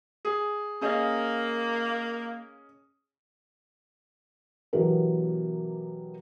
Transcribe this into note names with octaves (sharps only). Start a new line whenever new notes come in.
G#4
A#3 C#4 G#4 D#5
B2 E3 F#3 B3 G4 A#4